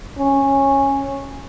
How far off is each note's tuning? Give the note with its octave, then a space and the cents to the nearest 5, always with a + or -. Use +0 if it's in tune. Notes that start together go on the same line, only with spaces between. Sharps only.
C#4 -10